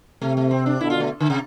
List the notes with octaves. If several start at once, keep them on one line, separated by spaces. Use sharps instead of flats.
C3 A3
A3
C4
D4
B2 D3 E4
F4
A3
D3
C3